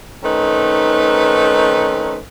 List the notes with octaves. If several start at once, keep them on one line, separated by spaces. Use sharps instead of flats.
D#3 A3 C4 C#4 D#4 B4